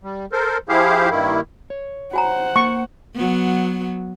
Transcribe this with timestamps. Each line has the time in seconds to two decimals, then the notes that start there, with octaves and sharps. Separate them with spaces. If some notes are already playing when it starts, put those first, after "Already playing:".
0.04 G3
0.32 A4 A#4 C5
0.69 F3 E4 G4 G#4 C5 F5
1.10 G2 D#3 A#3 E4
1.70 C#5
2.13 F#4 C5 F#5 G#5 A#5
2.56 A#3 C#6
3.15 F#3 B3